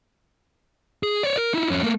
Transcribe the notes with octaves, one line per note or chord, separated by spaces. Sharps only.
G#4
C#5 D5
A#4
D#4 E4
F2 C#4
A3 A#3